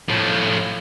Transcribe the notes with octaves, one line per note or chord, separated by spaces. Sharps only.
A2 F3